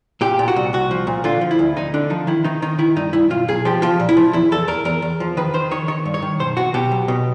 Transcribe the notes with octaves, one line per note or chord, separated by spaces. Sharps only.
A#2 G4
A#2
F#4
C2
C2 F#4
F3
A#2
D3 F4
F3
E4
D2
D2 D#4
D3 D4
F3 D#4
D#3 E4
D#3 D#4
D#3 D#4
D#3 E4
G2 D#4
G2 E4
B1 F4
B1 G#4
F3 G4
F3 F4
A#2
E4
F3
E2 E4
E2 A4
E2 A#4
E2 A#4
E2
F3
D#3 B4
D#3 C5
D#3 C#5
D#3 C#5
G2
C#5
D#3
B1 C5
B2 F#4
B2 G4
B1
B2